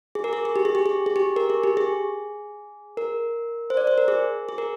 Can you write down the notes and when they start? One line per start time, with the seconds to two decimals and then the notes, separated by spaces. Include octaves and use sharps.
0.15 G#4
0.24 A#4
0.33 G#4
0.45 G#4
0.56 G4
0.65 G#4
0.75 G4
0.86 G#4
1.06 G#4
1.16 G4
1.36 A#4
1.50 G#4
1.63 G4
1.77 G#4
2.97 A#4
3.70 C5
3.77 D5
3.87 C5
3.98 A#4
4.08 G#4
4.49 G#4
4.58 A#4